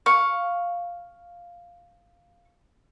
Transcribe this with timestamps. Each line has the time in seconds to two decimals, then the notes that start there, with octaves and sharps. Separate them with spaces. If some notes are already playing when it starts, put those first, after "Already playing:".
0.06 F5 C#6